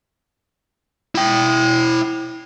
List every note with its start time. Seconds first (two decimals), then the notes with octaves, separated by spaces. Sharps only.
1.15 E4 G5